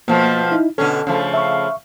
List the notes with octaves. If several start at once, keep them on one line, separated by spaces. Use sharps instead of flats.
B2 F3 A3 A#3
D#4 E4
B2 D3 C#4 A4
C#3 F3 A3
E5 C#6